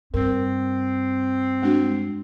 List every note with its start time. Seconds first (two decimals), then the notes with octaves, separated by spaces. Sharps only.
0.14 G2 C4 A#4
1.62 G#3 D4 F#4